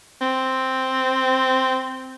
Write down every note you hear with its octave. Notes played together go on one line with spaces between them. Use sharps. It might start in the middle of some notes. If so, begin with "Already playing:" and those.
C4